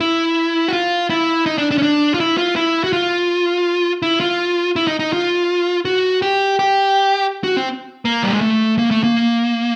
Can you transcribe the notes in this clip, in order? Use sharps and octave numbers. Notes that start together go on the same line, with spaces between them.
E4
F#4
F4
E4
D#4
D4
D4
C#4
D4
F4
E4
F4
E4
F#4
F4
E4
F4
E4
D#4
D#4
F4
F#4
G4
G4
F#4
C4
A#3
G3
G#3
A3
A#3
A3
A#3